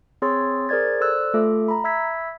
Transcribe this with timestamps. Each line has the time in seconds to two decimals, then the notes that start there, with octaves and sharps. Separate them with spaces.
0.22 C4 G#4 C#5 C6 E6 A6
0.69 G#4 A#4 C5 D5 G#6 A6
1.01 A4 C5 D5 E6 F#6
1.34 A3 F4 A4 E5 D6
1.68 A#5 B5
1.84 E5 B5 E6 G#6 B6